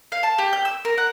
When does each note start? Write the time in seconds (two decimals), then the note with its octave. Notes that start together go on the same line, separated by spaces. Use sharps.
0.12 F5
0.23 A5
0.38 G4
0.53 G6
0.65 E6
0.85 A#4
0.98 F#5